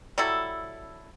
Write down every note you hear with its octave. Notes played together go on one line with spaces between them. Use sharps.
F#3 G3 E4 A4